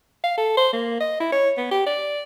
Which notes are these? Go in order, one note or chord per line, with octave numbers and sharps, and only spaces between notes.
F5
A4
C5
A#3
D#5
E4
C#5
B3
G4
D5